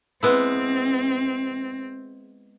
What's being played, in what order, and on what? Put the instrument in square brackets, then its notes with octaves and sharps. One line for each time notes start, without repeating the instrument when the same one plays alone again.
[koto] G#3 B3 E4 [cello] C4